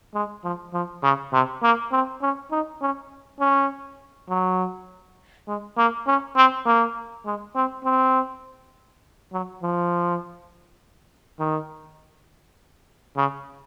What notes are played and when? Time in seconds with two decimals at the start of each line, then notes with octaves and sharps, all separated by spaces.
0.14 G#3
0.44 F3
0.73 F3
1.03 C#3
1.33 C3
1.63 A#3
1.92 C4
2.22 C#4
2.51 D#4
2.82 C#4
3.40 C#4
4.29 F#3
5.47 G#3
5.77 A#3
6.07 C#4
6.36 C4
6.66 A#3
7.25 G#3
7.55 C4
7.84 C4
9.33 F#3
9.63 F3
11.39 D#3
13.17 C#3